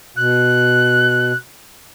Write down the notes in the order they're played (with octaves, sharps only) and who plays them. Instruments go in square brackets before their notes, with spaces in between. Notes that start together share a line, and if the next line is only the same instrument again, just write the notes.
[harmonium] B2 [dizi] F#6